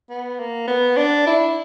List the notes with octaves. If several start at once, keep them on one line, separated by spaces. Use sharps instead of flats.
B3
A#3
B3
D4
E4